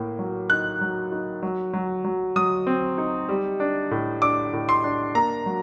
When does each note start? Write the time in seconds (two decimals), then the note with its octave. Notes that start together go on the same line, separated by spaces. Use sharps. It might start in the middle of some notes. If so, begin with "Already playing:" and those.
Already playing: A2 A#3
0.19 F#3
0.50 D#4 F#6
0.81 F#3
1.12 D#4
1.43 F#3
1.74 F#3
2.05 F#3
2.36 F#3 D#6
2.67 C4
2.98 D#4
3.29 G3
3.60 D4
3.91 A2
4.22 D4 D6
4.53 A2
4.69 C6
4.84 D4
5.15 A#3 A#5
5.46 F#3